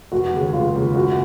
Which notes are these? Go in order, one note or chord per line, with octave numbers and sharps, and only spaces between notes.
F1 F#4
D#2 C#3 G#3
F1 F4
D#2 C#3 G#3
F#1 F#4